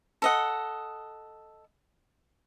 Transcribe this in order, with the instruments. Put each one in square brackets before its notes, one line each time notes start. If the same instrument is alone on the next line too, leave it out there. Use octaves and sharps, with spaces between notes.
[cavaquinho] A4 D#5 F#5